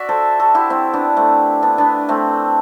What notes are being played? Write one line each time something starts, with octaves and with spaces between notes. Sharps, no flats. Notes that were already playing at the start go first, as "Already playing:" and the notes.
Already playing: F#4 D5 E5
A4 C5
F#4 A4
E4 G4
C4 E4
B3 D4
A3 C4
B3 D4
B3 D4
A3 C4